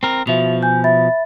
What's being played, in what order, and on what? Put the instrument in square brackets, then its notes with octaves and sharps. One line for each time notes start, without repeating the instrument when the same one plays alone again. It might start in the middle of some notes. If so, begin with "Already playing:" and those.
[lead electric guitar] C4 A#4
[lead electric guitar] B2 F3 [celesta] F#4 E5 F7
[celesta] G#5 G6
E5 B5 A6